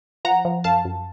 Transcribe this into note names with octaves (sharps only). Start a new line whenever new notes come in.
F3 F#5 A#5
F3
F#2 F5 A5
F#2